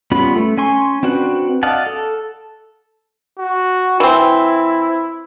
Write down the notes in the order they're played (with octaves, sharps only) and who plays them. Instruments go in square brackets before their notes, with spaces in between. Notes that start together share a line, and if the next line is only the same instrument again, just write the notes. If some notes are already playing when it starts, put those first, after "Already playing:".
[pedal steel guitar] G3 B3 C#4 F4 B5
A3
C#4 G#5 C6 C#6
C4 D4 F#4 B4
D5 D#5 F5 F#5 A5
A4
[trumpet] F#4
[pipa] E3 C4 [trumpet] E4